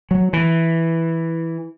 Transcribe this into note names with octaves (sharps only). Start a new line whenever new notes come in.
F#3
E3